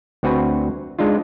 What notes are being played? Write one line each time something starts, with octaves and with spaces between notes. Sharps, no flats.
D2 C4 F#4 B4 G#5
G#3 D4 D#4 F4